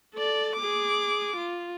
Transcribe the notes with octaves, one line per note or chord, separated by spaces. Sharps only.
A4 D5
G#4 D6
F4